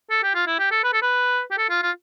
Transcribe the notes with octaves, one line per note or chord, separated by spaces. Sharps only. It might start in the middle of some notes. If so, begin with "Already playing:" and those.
A4
G4
F4
E4
G4
A4
B4
A4
B4
G4
A4
F4
F4